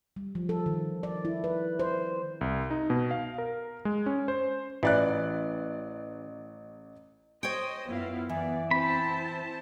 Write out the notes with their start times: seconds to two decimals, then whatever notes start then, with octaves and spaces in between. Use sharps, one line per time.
0.16 G3
0.35 F3
0.49 A4
0.66 D#3
1.03 D5
1.25 E4
1.44 B4
1.79 C5
2.41 C2
2.70 D#4
2.90 B2
3.11 F5
3.38 A#4
3.85 G#3
4.06 C#4
4.28 C5
4.83 A1 E3 D5 F#6
7.43 C5 C#5 D#5 G5
7.87 F#2 B3 E4 F4 F5
8.29 E3 D5
8.71 C4 E4 C5 A5 B5